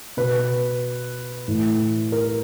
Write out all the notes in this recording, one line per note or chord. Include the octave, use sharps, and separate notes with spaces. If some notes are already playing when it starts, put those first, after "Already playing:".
B2 B4
A2 E3
A#4